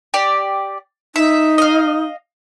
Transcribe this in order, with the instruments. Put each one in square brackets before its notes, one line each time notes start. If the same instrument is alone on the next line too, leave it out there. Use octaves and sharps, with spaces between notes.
[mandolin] G4 D5
[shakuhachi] D#4 [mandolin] E5
[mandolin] D#5 F5